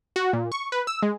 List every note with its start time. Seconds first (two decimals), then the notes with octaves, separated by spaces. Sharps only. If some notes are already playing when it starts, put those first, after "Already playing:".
0.16 F#4
0.33 A#2
0.52 C#6
0.72 B4
0.87 E6
1.03 G#3